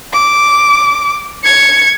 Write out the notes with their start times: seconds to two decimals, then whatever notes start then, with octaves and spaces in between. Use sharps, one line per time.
0.13 D6
1.44 G#6 C#7